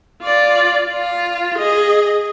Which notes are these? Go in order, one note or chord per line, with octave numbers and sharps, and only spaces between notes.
F4 D5
F4
G#4 D#5